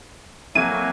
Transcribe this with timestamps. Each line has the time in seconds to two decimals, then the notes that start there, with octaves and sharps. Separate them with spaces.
0.55 F2 F#3 A#3 E4 G#5 D#7